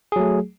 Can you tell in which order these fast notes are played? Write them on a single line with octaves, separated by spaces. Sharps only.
G#4 F#3 A3